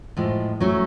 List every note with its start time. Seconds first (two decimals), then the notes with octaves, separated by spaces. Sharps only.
0.17 A2 F3 G#3
0.60 F#3 A3 C#4